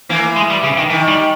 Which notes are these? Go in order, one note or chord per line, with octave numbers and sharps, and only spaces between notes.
E3 A#3
G#3
G3
C#3
D#3
D#3 E3
G3